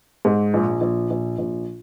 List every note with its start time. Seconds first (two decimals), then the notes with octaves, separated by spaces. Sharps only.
0.25 G#2
0.54 A#1
0.81 A#1
1.10 A#1
1.38 A#1